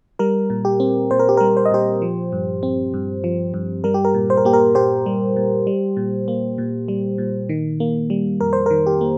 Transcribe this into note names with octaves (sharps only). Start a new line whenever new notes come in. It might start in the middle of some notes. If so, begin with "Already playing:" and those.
G3 A#4
A#2
G4
C4
A#2 C5
A#4
G4
A#4
G3
C5
D#5
A#2 G4 C5
F3
G2
C4
G2
F3
G2
G3 A#4
G4
A#4
A#2
C5
A#4
A#3 G4
A#4
A#2 G4 C5
G3
A#2
G3
A#2
A#3
A#2
G3
A#2
D#3
A#3
G3
F2 A#4
C5
A#4
D#3
G4
A#3